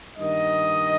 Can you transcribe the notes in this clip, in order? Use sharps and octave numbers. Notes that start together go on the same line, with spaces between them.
G2 D#3 A#3 D#5